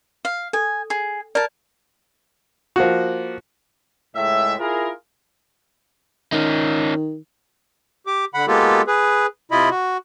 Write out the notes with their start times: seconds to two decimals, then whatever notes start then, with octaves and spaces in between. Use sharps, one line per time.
0.25 F5
0.53 A4 G#5
0.90 G#4
1.35 A#4 D5 A5
2.76 F3 A#3 F#4
4.16 C#2 A2 G#3 E5
4.59 E4 F4 G#4 A#4
6.32 D#3 C#4 D#4
8.07 G4 D6
8.34 D3 F#5 B5
8.48 G#3 A#3 B3 F4 G4 A4
8.87 G#4 B4
9.51 C3 E4 F4 D#5 B5
9.71 F#4